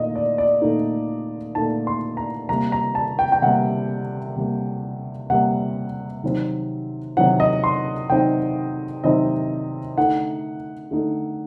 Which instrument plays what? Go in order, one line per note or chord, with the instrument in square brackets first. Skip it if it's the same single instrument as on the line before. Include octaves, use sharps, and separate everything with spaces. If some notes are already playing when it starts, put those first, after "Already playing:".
Already playing: [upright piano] A#2 A3 D#4 D#5
D5
D5
A#2 A3 D#4
A#2 A3 D#4 A5
C6
A#5
C3 G3 A#3 A#5
A#5
A5
G5
G5
C3 G3 A#3 F#5
C3 G3 A#3
C3 G3 A#3 F#5
C3 D#3 F#3 C4 D#4
C3 D#3 F#3 C4 D#4 F#5
D#5
C6
C3 D#3 F#3 C4 D#4 G5
C3 D#3 F#3 C4 D#4 D#5
D3 A3 D#4 F#5
D3 A3 D#4